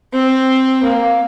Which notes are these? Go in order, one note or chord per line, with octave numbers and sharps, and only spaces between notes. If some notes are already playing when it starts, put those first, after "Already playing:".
C4
A#3